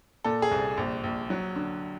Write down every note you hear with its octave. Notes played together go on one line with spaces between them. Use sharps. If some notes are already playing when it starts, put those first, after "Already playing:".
A#2 A4
G#4
C2
A#1
A#1
F#3
D3